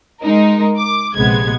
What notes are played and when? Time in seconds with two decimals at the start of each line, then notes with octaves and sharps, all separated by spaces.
0.22 G#3 D#4 A#4
0.77 D6
1.15 A#1 C3 G#3 B3 G#6